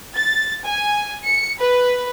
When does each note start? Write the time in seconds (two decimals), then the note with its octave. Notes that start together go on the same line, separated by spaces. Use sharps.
0.16 A6
0.65 G#5
1.25 C#7
1.60 B4